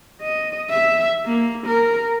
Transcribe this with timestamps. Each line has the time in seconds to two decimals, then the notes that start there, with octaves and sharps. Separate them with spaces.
0.21 D#5
0.70 E5
1.26 A#3
1.67 A#4